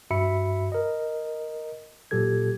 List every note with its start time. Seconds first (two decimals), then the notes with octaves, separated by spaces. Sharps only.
0.11 G2 F#4 E5 B5 C#7
0.72 A#4 D#5
2.11 A#2 F#3 G4 A4 G#6